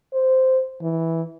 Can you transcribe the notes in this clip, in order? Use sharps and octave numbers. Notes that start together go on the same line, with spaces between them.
C5
E3